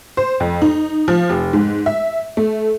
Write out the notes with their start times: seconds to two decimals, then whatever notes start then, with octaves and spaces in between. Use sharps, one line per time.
0.17 C5
0.40 F2
0.62 D#4
1.08 F3
1.29 F1
1.53 G#2
1.86 E5
2.37 A3